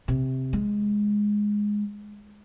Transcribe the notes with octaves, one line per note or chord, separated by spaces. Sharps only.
C3
G#3